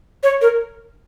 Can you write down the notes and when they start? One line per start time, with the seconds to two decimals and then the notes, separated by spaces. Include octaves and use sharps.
0.23 C#5
0.41 A#4